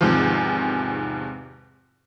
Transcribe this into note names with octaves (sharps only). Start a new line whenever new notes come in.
E2 G#2 C3 D#3 F3